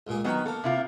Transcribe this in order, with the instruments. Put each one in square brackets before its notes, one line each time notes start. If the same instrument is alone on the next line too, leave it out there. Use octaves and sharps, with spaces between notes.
[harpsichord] C#2 A#2 G#4
[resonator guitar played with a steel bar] D#3 F#3 B3 [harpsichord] D#5 B5
[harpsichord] A#3 F5 [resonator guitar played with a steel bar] A4
[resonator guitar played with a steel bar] C3 E4 F4